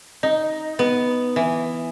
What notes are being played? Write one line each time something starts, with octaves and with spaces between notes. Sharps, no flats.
D#4
B3
E3